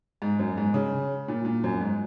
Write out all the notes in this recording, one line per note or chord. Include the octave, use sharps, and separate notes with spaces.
G#2
F#2
G#2
C#3
A#2
A#2
F#2
G#2